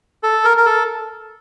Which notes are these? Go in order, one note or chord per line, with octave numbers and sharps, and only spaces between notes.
A4
A#4
A#4
A4